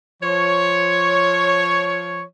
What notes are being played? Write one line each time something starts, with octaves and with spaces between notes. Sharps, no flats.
F3 C#5